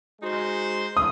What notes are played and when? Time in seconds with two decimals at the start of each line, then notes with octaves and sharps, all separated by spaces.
0.19 G#3 D#4 F#4 C5
0.97 D#6